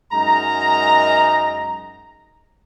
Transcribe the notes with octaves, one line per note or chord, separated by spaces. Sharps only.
F#2 G#3 D#4 A#5